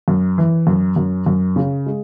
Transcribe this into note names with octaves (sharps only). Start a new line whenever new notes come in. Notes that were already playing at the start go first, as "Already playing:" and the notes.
F#2
E3
F#2
F#2
F#2
C#3
G#3